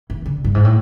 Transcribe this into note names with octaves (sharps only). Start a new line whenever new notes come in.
E3
D3
G2
G#2
A2